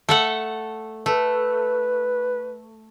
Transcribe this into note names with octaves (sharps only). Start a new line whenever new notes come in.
A3 A4 F#5
A3 B4